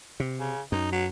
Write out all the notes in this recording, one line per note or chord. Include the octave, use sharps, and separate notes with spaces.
C3
C#3
F#2 D#4
F#3